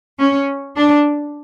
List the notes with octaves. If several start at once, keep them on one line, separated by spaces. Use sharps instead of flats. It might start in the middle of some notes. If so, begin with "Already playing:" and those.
C#4
D4